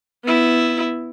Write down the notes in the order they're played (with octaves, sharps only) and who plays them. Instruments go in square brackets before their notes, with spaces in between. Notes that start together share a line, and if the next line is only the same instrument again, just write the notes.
[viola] B3 E4